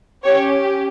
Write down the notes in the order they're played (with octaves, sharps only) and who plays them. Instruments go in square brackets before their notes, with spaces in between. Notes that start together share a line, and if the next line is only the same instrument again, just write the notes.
[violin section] C#4 G4 C#5